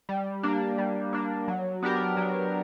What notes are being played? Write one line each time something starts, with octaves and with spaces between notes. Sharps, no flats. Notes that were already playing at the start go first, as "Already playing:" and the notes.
G3
A#3 D4
G3
A#3 D4
F#3
B3 D4 G4 A#4
F#3